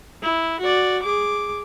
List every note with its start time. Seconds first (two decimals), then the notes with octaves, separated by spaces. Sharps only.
0.23 E4
0.60 F#4 D5
1.03 G#4 D6